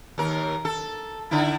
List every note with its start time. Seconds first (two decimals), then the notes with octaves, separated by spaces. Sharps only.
0.18 D#2 A#4
0.65 A4
1.31 D3 D#4 E4